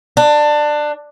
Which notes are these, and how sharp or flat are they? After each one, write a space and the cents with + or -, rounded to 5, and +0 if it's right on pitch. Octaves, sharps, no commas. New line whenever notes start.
D4 +20